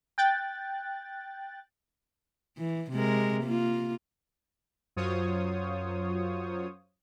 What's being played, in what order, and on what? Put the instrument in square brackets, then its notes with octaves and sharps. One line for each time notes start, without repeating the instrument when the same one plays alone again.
[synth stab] G5 F#6 A6
[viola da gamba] E3
C3 G#3 A#4
A#3 F4
[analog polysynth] F#2 F#3 F4 C5 C#5 D#6